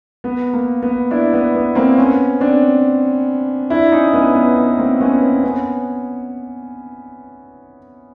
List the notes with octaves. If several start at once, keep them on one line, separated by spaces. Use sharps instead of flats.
B3
A#3
B3
D4 E4
B3
B3
A#3 C4
B3 C#4
C4 D4
D4 E4
C#4 D#4
B3 C#4
B3
B3
A#3 C4
B3 C#4
B3 C#4
B3 C#4